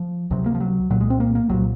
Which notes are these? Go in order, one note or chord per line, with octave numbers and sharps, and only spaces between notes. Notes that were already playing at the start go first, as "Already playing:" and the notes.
Already playing: F3
C#2 C3 F#3
A#3
F3
F#3
C2 A#2 F#3
G#3
C4
A#3
A#3
C2 A#2 F#3